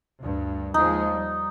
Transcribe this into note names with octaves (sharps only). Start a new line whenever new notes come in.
D2 G2
D#2 F3 G#3 D#4
G3